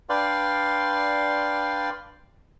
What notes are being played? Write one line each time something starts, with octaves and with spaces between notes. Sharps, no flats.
D4 B4 D5 F5 G5 C6